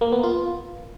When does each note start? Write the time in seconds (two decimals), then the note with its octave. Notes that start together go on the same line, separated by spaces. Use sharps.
0.01 A#3
0.12 B3
0.23 F4